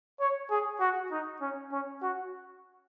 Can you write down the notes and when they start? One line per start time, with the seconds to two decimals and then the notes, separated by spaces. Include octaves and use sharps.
0.20 C#5
0.51 G#4
0.80 F#4
1.11 D#4
1.41 C#4
1.72 C#4
2.02 F#4